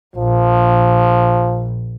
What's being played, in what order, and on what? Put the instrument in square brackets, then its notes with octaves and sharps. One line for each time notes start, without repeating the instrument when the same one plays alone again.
[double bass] A#1 [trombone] F3